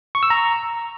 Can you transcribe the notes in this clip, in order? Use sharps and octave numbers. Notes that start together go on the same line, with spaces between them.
C#6
E6
A#5